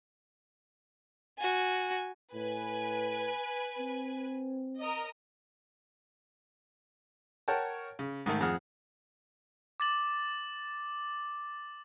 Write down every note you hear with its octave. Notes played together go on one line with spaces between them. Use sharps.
F#4 G#5
A2 B4 G#5
C4
A#4 D#5
A#4 C#5 F#5 G5 A5
C#3
G#2 D#3 A3
F2 G#4 F#5 F6
D6 A6 F#7